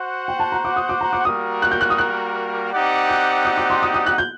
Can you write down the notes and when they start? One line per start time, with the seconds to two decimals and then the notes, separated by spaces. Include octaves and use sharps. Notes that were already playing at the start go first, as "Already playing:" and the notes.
Already playing: F#4 C5 F#5
0.28 G5
0.40 A5
0.52 A#5
0.65 D6
0.76 D#6
0.89 D6
1.01 A#5
1.13 D6
1.25 G3 A#3 F#4 A#4 D#6
1.62 F#6
1.71 G6
1.81 F#6
1.90 D#6
1.98 F#6
2.72 C4 D#4 G4 D5 F#5
3.09 F#6
3.45 D#6
3.58 D6
3.70 C6
3.83 D#6
3.94 D#6
4.06 F#6
4.18 G6